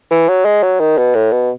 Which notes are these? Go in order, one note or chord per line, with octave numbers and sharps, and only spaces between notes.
E3
F#3
G#3
F#3
D#3
B2
A2
B2